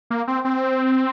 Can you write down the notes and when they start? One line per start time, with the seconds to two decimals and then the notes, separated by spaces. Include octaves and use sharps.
0.10 A#3
0.27 C4
0.45 C4